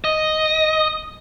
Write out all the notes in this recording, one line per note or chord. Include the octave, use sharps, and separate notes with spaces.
D#5